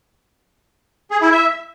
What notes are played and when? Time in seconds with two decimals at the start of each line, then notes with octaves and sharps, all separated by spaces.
1.11 G#4
1.21 E4
1.32 E5